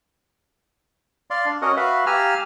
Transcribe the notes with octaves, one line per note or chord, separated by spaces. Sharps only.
D5 F5 C6
D4
C#4 F#4 A#4 D#5 F#5
F#4 B4 E5 F5
G4 F5 G#5 A#5 E6 F6